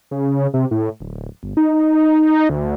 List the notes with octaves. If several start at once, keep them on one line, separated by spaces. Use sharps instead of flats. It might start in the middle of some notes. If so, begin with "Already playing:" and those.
C#3
C3
A2
D1
G1
D#4
D2